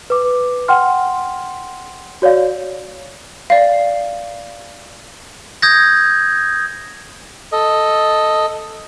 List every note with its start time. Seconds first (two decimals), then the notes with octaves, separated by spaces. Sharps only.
0.10 B4 D6
0.68 F#5 G5 C6 F6
2.22 F#4 C#5 D5 F5
3.50 D5 F5
5.62 D#6 G6 G#6 A#6
7.52 A4 D#5